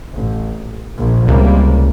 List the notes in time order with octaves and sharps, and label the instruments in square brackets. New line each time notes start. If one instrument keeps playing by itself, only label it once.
[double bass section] A1
A#1
[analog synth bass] C#2 [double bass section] C3 G3 A#3